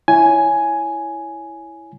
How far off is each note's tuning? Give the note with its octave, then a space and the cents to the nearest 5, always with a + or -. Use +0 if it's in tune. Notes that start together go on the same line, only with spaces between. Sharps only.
E4 +0 C#5 +15 G#5 +5